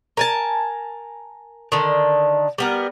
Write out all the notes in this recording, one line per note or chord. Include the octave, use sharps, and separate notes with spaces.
A#4 G#5 A5
D3 D#3
G3 B3 A#4